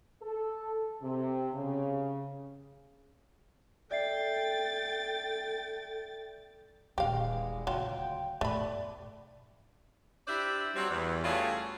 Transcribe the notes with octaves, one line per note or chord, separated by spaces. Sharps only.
A4
C3
C#3
A4 D5 E5 G5 A6 C7
D#1 D3 E3 G#3 D#4 G4 F5
D2 C#3 F#3 F4 G5
G#2 B2 A3 D5 B5
D4 E4 G4 C5 D5 E5
F#3 G3 C4
E2
G3 A3 C#4 F4 F#4 G#4